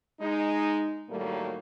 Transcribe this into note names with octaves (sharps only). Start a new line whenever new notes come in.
G#3 D#4
A2 D#3 F#3 G3 A3 A#3